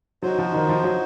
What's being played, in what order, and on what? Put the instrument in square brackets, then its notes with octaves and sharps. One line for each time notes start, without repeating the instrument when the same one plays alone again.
[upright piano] F#3 [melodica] D#4 F#4 C5
[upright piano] F3
D#3
F3
F#3